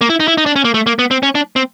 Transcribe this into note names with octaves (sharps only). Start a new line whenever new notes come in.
A#3
E4
D#4
E4
D#4
D4
C#4
A#3
A3
A#3
B3
C4
C#4
D4
C4